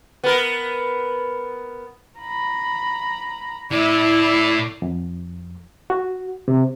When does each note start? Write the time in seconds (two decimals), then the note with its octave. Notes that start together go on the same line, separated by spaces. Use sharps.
0.24 B3 A#4
2.20 A#5 B5
3.71 A2 E4 D5
4.82 F2
5.90 F#4
6.48 C3